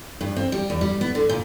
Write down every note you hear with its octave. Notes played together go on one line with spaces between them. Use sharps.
G2
C4
G3
E2
G3
B3
D3
A#2